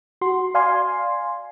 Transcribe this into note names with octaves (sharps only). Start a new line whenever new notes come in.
F#4 C6
D5 F5 G#5 C6